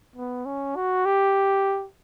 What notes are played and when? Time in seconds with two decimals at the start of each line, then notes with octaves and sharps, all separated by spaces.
0.16 B3
0.46 C#4
0.76 F#4
1.06 G4